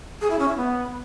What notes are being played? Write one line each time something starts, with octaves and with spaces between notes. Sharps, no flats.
G#4
E4
C#4
E4
B3